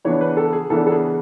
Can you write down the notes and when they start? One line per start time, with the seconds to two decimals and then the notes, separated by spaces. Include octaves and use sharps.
0.05 C#3 E3 B3 D4 C#5
0.21 B4
0.37 A4
0.53 G#4
0.70 C#3 E3 B3 D4 A4
0.87 A4
0.92 G#4